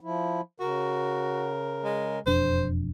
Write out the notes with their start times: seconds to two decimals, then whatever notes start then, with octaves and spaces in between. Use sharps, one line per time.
0.01 F3 E4
0.60 C#3 F#4 A#4
1.85 G#3
2.26 E1 F2 D4 C5